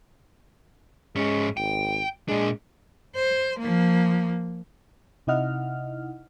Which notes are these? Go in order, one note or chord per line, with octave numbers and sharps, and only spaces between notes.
G#2 G#3 C#4
G#1 G5
A#2 G#3 D4
C5
F3 A#3
C3 D#4 E4 D#5 F#5 F6